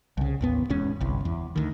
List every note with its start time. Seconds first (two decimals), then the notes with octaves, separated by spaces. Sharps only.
0.17 C2 C#3
0.41 A1 D#2 B3
0.70 E1 E2 G#2 C#4
1.01 G1 C2
1.25 E2
1.56 D2 D#3